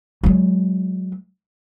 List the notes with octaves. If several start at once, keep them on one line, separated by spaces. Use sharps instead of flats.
F#3 G#3